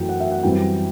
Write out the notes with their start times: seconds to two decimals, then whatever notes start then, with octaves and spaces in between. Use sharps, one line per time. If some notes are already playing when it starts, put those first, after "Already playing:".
Already playing: F#2 E3 A3 G5
0.09 F#5
0.20 E5
0.32 F#5
0.43 F#2 E3 G3 C4 G5